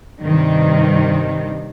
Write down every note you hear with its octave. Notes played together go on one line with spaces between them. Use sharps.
G2 C3 D#3